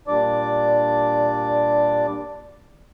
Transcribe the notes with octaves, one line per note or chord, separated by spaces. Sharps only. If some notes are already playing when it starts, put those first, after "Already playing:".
A#2 G3 D4 D5 D6